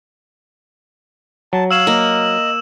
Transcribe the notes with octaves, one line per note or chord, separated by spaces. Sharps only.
F#3 A5
C#5 F5 E6 E7 F#7
A#3 D#5